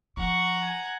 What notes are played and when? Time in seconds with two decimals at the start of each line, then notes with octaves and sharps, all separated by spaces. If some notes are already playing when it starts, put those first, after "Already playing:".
0.17 F3 F#5 A#5 C#6
0.61 G#5